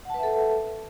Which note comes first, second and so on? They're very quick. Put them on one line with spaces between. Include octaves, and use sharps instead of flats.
F#5 A5 B4 E5 A4